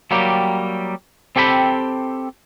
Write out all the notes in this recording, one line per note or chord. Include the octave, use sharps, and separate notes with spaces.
F#3 G3 A#3 G4
C4 G4 A4 G5 B5